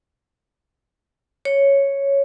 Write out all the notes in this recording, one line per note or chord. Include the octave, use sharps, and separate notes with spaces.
C#5